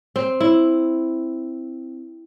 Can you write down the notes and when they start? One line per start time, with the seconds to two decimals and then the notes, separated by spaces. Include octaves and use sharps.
0.16 C4
0.40 E4